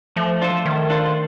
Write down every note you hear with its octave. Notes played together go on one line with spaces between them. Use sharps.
F3 A3
D4 F4 A4 C5
D#3 A3
D4 F4 A4 C5